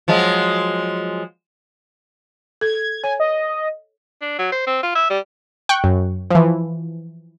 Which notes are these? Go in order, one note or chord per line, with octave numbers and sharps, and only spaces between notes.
F3 F#3 G#3
A4 G#6
C#5 G#5
D#5
D4
F#3
C5
C4
F4
E5
G3
G5 C#6 F#6
F#2
E3 F3